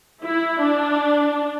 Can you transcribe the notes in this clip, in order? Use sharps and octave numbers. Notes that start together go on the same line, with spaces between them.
E4
D4